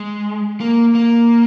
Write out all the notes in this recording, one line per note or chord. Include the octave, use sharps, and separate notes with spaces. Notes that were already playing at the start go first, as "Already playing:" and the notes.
Already playing: G#3
A#3
A#3